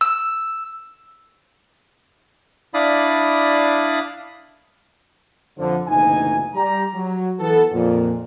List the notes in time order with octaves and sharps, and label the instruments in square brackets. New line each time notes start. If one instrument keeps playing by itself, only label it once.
[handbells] E6
[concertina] D4 E4 D5 F5 B5 D#6
[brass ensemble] F2 D3 F3
F#1 D2 B2 E3 D#4 G#5
G3 G4 A#5
F#3
E3 B3 A4
F2 A#2